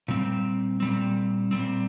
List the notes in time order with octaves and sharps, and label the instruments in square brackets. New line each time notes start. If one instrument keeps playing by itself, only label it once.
[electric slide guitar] A#2 G3 C4
A#2 G3 C4
A#2 G3 C4